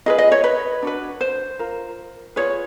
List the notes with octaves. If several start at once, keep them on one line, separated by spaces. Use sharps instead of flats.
F4 G#4 B4 D#5
D#5
C#5
B4
D4 F#4 B4
C5
F4 A#4
F4 G#4 B4 C#5